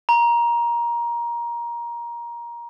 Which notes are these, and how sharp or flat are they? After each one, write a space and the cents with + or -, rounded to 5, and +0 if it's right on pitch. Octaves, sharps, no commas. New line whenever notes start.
A#5 +20